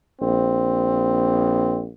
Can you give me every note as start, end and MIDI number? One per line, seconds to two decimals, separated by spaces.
0.21 1.91 34
0.21 1.82 60